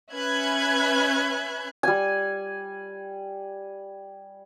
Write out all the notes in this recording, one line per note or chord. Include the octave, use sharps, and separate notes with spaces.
C#4 B4 E5 B5 F#6 G#6
G3 G#5